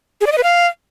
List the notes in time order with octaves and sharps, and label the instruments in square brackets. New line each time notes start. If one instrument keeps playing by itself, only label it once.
[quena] G#4
D5
D#5
B4
F5